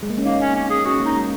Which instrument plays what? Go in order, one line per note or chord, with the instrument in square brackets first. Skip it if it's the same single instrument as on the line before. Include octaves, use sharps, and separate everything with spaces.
[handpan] G#3
A#3
C#4
[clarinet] A#3 [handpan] D#4
[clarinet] C#4
C#4
G#4
[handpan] C#4 [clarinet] F#4
[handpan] A#3
[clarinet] D#4
[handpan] G#3